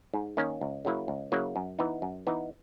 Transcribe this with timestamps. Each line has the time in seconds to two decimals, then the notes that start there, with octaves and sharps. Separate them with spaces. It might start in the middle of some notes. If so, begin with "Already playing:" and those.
0.14 G#2
0.37 D#3 A#3 C#4
0.61 C#2
0.85 C#3 F#3 A#3 E4
1.08 C#2
1.32 C#3 F#3 A#3 E4
1.56 F#2
1.79 E3 B3 D#4
2.02 F#2
2.27 E3 B3 D#4